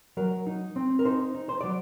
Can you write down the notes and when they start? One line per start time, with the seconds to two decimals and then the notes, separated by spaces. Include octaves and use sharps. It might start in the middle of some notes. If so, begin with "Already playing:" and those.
0.17 F#3 A#4
0.47 D#4
0.76 C4
0.99 A#4
1.05 D#4 C5
1.35 D#4
1.49 C5
1.61 F#3 D5